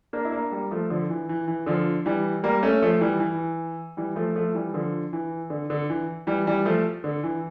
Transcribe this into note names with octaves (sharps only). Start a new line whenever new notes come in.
A#3 D4
E4
A#3 D4
G3 A#3
F3 A3
D3 F3
E3
E3
E3
D3 F3
E3 G3
G3 A#3
A3 C#4
F3 A3
E3 G3
E3
E3 G3
F3 A3
F3 A3
E3 G3
D3 F3
E3
D3
D3
E3
E3 G3
E3 G3
F3 A3
D3
E3